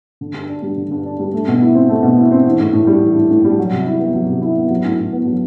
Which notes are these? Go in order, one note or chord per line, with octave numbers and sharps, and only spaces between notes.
D3
G2
D4
G3
D3
G2
D4
G3
A3
B2
E4
C4
A3
B2
E4
C4
E3
A2
A2
G3
E3
A2
A2
G3
F#3
C3
E4
B3
F#3
C3
E4
B3
F#3
A2
A2
B3
F#3